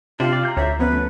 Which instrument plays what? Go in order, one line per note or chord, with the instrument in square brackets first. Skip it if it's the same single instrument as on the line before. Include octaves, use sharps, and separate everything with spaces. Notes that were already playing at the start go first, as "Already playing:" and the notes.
[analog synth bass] C3 [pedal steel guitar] D4 C5 [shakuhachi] F4 [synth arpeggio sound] G5
[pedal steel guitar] D5
A#5 G6
[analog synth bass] D2 [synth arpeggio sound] C#5 [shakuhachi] E5
[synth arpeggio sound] F3 B3 C#4 [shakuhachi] B4
[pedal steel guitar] A3